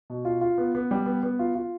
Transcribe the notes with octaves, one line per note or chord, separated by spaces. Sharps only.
B2
F4
F4
B3
B3
G3
B3
B3
F4
F4